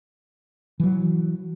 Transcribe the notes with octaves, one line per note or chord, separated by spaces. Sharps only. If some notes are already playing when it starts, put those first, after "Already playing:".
E3 F#3